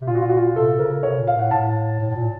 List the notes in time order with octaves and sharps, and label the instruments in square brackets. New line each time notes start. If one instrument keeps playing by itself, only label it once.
[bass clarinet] C3
[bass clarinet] A#2 [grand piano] F4
[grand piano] F#4
F4
F#4
F4
[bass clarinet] C3 [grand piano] A4
[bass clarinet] C#3 [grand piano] A#4
[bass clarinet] C3 [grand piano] C#5
[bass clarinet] A#2
[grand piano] F5
[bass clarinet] A2 [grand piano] F#5
[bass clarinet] A2 [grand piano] A5
[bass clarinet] A2
A2
A#2